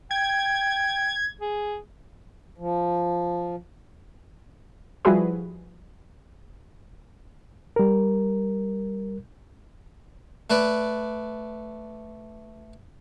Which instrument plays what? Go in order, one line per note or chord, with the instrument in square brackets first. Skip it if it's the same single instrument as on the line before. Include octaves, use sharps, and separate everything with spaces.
[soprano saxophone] G5 [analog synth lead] G#6
[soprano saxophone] G#4
[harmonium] F3
[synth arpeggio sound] F3 G3 E4 F#4 G#4 B4
[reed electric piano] G3 A#4
[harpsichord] A3 B4 D5